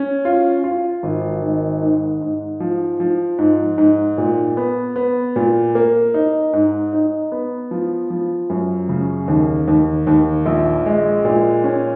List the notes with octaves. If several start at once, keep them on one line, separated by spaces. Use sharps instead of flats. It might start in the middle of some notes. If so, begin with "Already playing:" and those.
Already playing: C#4
F4
F4
G#1
D#3
G#2
G#2
F3
F3
G#2
G#2
A#2
B3
B3
A#2
A#3
D#4
G#2
D#4
B3
F3
F3
F#2
C#3
D#2
D#2
D#2
A#1
G#3
A#2
C#4